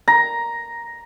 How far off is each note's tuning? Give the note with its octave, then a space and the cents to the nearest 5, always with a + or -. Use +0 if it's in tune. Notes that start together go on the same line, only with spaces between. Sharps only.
A#5 +5